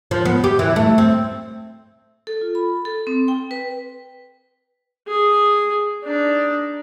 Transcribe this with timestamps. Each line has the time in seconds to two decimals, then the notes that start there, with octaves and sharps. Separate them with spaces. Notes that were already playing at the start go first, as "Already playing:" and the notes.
0.11 F3
0.25 B3
0.44 G4
0.59 E3
0.76 A3
0.98 C4
2.27 A4
2.41 F4
2.55 B5
2.85 A4
3.07 C4
3.28 G5
3.51 B4
5.07 G#4
6.04 D4 D#4